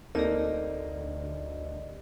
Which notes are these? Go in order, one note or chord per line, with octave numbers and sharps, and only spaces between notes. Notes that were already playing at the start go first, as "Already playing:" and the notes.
D2 A#3 C4 D#4 G4 A4 D5 D#5